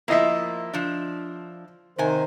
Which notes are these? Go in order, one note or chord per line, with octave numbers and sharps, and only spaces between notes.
F3 A#3 E4 D#5 E5
F3 D4
C3 D#3 C5 G#5